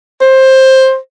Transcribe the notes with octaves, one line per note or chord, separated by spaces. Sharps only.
C5